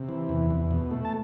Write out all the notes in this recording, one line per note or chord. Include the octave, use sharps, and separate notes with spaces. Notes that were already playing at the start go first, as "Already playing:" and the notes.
Already playing: C3
E3
E2
E2
B2
A3
A5